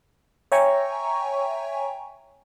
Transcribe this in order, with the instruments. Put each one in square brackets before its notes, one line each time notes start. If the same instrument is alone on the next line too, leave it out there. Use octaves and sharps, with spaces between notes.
[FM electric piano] C#5 E5 G5 G#5 A#5 C#6